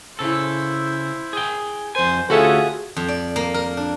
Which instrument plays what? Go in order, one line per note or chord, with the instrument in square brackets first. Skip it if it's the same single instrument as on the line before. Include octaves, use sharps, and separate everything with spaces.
[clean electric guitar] C#3 A4 [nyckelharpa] E4 C5
[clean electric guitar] G#4 G5
[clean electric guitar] F2 G#5 [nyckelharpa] C5
[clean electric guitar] D2 C#4 [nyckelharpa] F4 G#4 [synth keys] F#4 A4 E5
[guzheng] F2
D5
A#3
A#4
D4